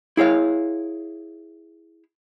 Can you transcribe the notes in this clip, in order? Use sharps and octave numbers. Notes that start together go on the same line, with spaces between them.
E4 G#4 C#5 F5